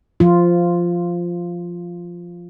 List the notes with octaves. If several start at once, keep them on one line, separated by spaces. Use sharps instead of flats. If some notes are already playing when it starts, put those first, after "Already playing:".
F3 F4